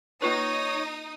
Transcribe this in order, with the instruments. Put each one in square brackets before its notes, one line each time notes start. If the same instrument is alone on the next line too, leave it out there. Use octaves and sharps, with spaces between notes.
[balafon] A#3 F4 B4 [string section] D#4 D#6 [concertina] C#5